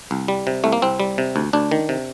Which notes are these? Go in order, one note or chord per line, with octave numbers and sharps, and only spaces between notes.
C2
G3
C3
C2 A3
A#3
C2 C4
G3
C3
D2
D2 D4
D#3
C3